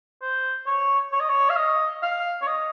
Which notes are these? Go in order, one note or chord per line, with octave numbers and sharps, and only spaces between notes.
C5
C#5
C#5
D#5
C#5
F5
D#5
F5
C#5
D#5